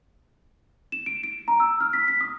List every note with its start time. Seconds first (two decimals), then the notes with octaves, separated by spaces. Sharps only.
0.92 E7
1.06 D7
1.24 D7
1.48 A#5
1.60 E6
1.80 F6
1.93 B6
2.08 B6
2.21 D#6